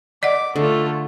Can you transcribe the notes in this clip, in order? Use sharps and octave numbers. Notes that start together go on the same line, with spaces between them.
D5 D#5 F#5 D6
D3 A3 F4